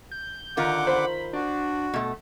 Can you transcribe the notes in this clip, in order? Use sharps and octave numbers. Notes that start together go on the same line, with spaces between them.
G6
D3 D#3 F4 A#4 F#5 D6
C5 B5
D4 F#4
B2 A3